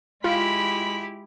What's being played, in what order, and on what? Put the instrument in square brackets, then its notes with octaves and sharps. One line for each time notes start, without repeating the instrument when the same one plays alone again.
[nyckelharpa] G#3 B5 [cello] E4 G4 [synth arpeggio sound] F4